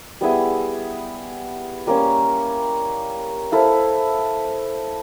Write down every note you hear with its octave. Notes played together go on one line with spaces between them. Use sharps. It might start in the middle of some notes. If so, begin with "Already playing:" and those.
G3 B3 E4 G#4
G3 A#3 C#4
E4 A4 C5 F5